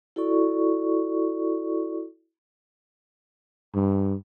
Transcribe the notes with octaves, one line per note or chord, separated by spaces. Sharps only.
E4 F#4 A4 D5 C#6
G2